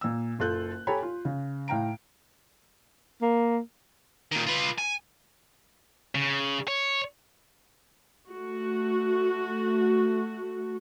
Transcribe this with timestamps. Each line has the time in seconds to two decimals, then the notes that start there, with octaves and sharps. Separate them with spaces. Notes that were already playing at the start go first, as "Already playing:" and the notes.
0.01 A#2 E6
0.39 F#1 F4 A4 F#6 G6
0.87 G4 A4 C#5 G#5 A#5 B5
1.02 F4
1.25 C#3
1.68 A2 F5 G5 A#5 D7
3.22 A#3
4.32 A#2 D#3
4.46 F4 B4
4.78 G#5
6.15 C#3
6.68 C#5
8.31 A3 F#4